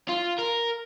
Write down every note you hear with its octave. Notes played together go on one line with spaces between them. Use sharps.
F4
A#4